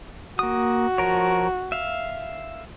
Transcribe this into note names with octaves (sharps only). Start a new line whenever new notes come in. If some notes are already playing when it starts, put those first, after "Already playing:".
A#3 F#4 D#6
F3 A#4 C#5
E5 F5